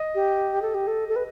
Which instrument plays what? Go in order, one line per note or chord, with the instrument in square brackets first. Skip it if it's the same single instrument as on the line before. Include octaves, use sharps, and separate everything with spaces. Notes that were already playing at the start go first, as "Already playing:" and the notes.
Already playing: [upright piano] D#5
[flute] G4
A4
G4
A4
A4
B4